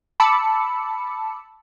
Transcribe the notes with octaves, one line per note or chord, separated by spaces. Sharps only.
A5 B5 D6 E6 C#7